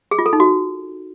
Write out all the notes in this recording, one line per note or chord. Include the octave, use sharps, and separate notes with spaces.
G#4
F4
A4
D#4
F#4